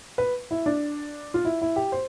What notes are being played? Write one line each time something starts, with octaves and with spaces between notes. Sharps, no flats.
B4
E4
D4
F4
E4
E4
G4
C5